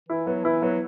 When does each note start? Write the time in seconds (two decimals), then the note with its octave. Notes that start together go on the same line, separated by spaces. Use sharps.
0.09 E3 E4
0.27 F#3 B3
0.44 E3 E4
0.62 F#3 B3